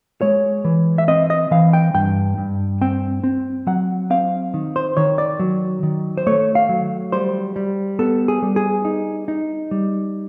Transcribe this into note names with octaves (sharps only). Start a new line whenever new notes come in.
G#3 C#5
E3
E5
C4 D#5
D#5
E3 F5
G5
G2 G5
G2
C4 G5
C4
F#3 F#5
C4 F5
D#3
C5
D#3 C#5
D5
F#3
D#3
C5
A3 C#5
F5
F#3
G3 C5
G3
B3 A4
G#4
G3
G#4
D#4
D#4
G3